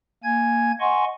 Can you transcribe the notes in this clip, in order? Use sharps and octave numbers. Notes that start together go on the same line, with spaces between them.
A#3 G#5 G#6
D#5 F#5 G#5 C6 C#6